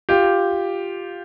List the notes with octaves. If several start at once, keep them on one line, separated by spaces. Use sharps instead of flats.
F4 G4